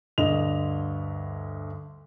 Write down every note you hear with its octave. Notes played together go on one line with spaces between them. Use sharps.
D2 G2 D3 D#5 F7